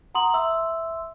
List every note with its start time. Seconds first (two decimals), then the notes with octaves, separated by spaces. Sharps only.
0.14 F#5 A#5 C6 D#6 F#7
0.34 E5 C6 E6